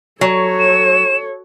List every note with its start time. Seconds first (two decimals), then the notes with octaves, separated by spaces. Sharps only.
0.21 F#3 A4 C#5
0.59 E7